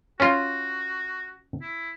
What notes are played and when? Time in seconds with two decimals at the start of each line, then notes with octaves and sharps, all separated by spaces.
0.20 C#4 F4 F#4
1.61 E4